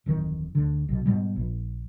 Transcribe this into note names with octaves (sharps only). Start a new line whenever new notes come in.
D1 F2 D#3
D2 D3
B1 B2
G#2 B2 G3
A#1